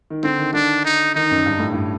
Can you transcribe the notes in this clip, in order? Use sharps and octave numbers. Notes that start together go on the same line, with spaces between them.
D#3
D3 C4
D#3
D3 D4
D#4
D#3 D#4
F#2
G2
A2
G2